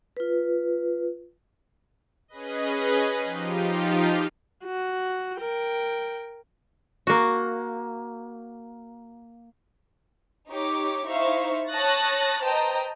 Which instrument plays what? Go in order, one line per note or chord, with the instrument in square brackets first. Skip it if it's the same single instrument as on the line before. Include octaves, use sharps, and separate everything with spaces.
[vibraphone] F4 B4
[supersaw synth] C#4 G#4 B4 D#5
F3 D#4 F4 G4
[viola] F#4
A#4 G5
[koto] A#3 F#4
[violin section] D#4 G4 C#5 D6
D#4 E4 C5 E5 F5 C#6
C#5 A5 D#6 F#6 A6 A#6
B4 C5 D#5 G5 A5 A#5